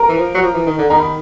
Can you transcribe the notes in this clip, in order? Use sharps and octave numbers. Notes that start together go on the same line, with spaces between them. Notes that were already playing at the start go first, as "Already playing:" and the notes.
Already playing: A#4 A#5
E3
F3
F#3
F3
E3
D#3
D3
D#3 A#5
B5